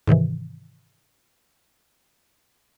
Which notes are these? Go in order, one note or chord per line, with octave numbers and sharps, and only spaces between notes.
G#2 C3 D#3 E3